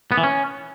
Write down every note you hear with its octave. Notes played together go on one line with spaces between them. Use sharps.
B3
E3
C#4